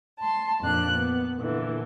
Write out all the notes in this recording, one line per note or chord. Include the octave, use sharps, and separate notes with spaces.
A5 C6
F2 A#2 D4 F#6
B3
A#2 D3 E3